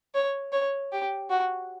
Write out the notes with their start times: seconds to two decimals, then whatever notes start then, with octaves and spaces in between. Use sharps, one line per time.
0.14 C#5
0.53 C#5
0.92 G4
1.30 F#4